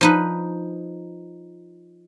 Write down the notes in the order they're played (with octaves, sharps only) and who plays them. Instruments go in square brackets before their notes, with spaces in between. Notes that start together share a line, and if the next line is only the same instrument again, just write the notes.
[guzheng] F3 D#4 B4